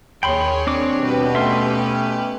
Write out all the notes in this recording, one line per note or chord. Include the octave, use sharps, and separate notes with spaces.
D#2 G#4 C#5 G5 B5 C6
C4 D4 D6
B2 G3 F#4 G4 B4
A3 C#4 E5 C6